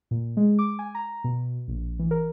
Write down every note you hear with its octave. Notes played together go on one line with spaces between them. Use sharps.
A#2
G#3
D6
G#5
A#5
B2
A#1
E3
A#4